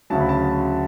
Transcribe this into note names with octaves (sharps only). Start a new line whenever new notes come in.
D2 C#3 F#3 A5
B5
A5